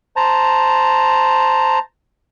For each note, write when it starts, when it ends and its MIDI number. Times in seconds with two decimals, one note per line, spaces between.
0.16 1.79 72
0.16 1.79 81
0.16 1.79 82